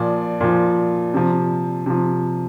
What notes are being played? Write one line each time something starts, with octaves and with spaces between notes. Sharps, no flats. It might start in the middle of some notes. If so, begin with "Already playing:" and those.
Already playing: A#2 F3 D5
A#2 F3
C3 F3
C3 F3